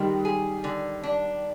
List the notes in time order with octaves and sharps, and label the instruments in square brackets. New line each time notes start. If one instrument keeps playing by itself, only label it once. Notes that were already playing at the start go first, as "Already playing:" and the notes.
Already playing: [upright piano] D#3 G3 [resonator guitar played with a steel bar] G#3
[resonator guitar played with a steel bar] G#4
D3
D4